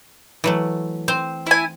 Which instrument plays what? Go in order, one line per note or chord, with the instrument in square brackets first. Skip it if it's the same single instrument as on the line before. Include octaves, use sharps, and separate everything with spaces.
[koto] E3 F#3 A3
C4 C5
[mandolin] E4 G#5